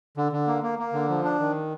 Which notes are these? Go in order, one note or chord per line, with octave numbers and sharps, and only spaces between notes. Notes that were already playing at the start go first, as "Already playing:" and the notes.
D3
D3
A#3
A#3
A#3
D3
F3
D4
D#3